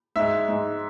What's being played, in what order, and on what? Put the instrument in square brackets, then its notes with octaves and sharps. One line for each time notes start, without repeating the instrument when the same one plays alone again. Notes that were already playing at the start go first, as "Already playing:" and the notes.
[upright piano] G#2 G#3 E5
G#2 G#3